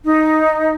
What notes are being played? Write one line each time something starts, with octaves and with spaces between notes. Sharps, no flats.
D#4